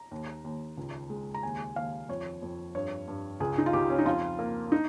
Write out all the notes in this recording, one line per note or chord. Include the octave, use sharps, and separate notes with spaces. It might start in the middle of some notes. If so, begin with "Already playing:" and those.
Already playing: A#5
D#2
D#2
C#2
G#3
A#5
D#2 G#5
D#2 F5
F2 C#5
F2
G2 C#5
G2
C#2 G#4
D#4
F4
C#2 G4
C#4
D#4
F2 F4
A#3
D#4